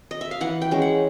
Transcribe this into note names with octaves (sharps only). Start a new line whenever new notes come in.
D#5
E5
F5
E3 F#5
G5
G#3 C#4
F#5